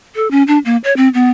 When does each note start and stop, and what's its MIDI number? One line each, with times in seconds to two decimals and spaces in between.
0.15 0.30 69
0.31 0.43 61
0.48 0.58 62
0.65 0.77 58
0.84 0.95 73
0.97 1.09 60
1.14 1.31 59